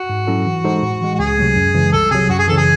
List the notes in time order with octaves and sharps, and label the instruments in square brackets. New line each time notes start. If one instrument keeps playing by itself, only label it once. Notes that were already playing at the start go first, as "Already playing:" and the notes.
Already playing: [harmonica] F#4
[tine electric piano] G#2
F#3 C#4 E4 A4
E3
G#3 D#4 A4 C5
A2
E3 G#3
[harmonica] F#4
[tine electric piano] C#2 [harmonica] G#4
[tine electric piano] C3 F#3 A3
F#2
C#3 E3 G#3
[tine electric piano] C2 [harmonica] A4
[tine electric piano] C3 F#3 [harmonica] G#4
[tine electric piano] F#2 [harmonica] F#4
[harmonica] G#4
[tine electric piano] C#3 E3 [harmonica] A4
[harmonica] G#4